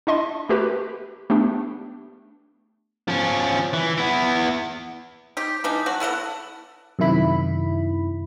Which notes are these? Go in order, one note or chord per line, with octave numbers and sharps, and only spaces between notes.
D4 E4 D#5 C6
A3 F#4 G4 A#4 B4
A3 B3 D4 G4
F3 C#4
E3
B3 E4
D#4 G4
E3 G3 D4 D#4
F#3 F#4
B3 E4 A4 F#5
F#2 C3 D#3 E4 B5